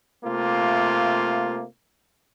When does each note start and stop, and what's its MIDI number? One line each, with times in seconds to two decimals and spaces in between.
0.24 1.64 48
0.24 1.64 57
0.24 1.64 58
0.24 1.64 65